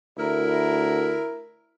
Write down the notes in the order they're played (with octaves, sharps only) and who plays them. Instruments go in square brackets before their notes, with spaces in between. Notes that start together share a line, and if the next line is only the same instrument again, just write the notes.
[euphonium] D2 [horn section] E4 A#4